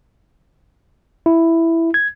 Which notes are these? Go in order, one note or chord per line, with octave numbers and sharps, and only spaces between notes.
E4
G#6